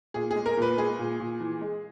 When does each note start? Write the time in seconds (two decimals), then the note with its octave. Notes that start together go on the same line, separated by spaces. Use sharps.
0.14 A#2 G#4
0.31 G#4
0.36 G#3
0.46 A#4
0.57 A#2 B4
0.77 G#3 G#4
0.99 A#2
1.20 A#2
1.40 E3
1.61 G#3